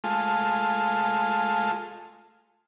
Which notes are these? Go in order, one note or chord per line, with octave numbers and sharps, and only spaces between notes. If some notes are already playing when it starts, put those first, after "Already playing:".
G#3 A3 F4